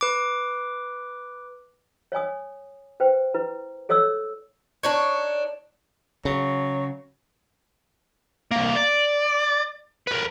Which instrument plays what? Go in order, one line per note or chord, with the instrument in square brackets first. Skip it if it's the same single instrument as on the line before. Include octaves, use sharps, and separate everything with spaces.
[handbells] B4 D6
[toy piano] C#5 D5 G#5 D#6
B4 C5 G5
E4 B4
A4 C#5 D5 D#6 E6
[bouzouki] D4 D#4 C#5
[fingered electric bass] C#3 [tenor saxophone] F#3
[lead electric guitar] C2 A#3
D5
A#4 B4